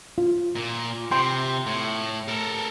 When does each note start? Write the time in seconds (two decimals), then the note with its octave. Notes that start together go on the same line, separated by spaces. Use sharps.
0.18 F4
0.55 A#2
1.11 C3 G5 C6
1.66 A2
2.28 A4 A#4